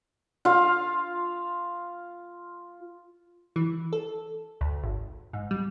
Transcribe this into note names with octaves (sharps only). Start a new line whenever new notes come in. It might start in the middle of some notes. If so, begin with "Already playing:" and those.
F4 F5
E3
A4
D2
G#1
G#2
G3